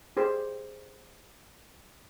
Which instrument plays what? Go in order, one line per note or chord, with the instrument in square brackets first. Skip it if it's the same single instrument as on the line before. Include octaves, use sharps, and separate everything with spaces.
[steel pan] G4 G#4 C5